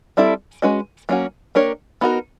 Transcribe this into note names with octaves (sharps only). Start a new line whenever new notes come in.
G3 C4 E4 A4 D5
G#3 C#4 F#4 B4 D#5
F#3 A#3 C#4 F#4
A#3 D4 G4 A#4 C#5
B3 D#4 F#4 A#4